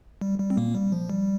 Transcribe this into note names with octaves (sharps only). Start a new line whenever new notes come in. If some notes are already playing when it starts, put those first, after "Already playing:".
G3
G3
C4
A#2 A#3
G3
F3
G3